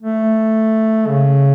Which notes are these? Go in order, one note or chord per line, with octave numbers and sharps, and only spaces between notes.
A3
C#3